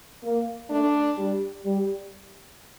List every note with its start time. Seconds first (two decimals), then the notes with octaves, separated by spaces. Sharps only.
0.23 A#3
0.70 A3 D4
1.17 G3
1.64 G3